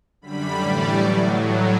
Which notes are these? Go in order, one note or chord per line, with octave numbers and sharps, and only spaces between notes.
F#2 D3 G3 B5
A2 E3 G3 D5
A2 F#3 C#6